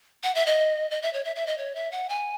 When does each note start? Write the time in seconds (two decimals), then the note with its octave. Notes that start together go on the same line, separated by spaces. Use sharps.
0.23 F#5
0.35 E5
0.46 D#5
0.91 D#5
1.02 E5
1.13 C#5
1.25 E5
1.36 E5
1.47 D#5
1.58 C#5
1.75 E5
1.92 F#5
2.09 G#5